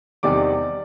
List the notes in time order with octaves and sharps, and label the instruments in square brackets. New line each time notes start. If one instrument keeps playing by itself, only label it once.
[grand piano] E2 C3 D#3 G3 D5 D6